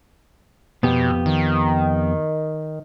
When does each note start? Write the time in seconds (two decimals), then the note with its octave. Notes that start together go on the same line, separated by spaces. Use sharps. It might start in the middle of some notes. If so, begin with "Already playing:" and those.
0.83 F2 B2 B3 G4
1.26 D#3